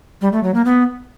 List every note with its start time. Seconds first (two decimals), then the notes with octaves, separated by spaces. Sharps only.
0.21 G3
0.32 A3
0.43 F#3
0.54 A#3
0.65 B3